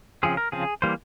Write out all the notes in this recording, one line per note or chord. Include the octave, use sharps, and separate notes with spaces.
C#3 F3 C4 G#4
A#4
C#3 F3 C4 G#4
E3 G3 A#3 C5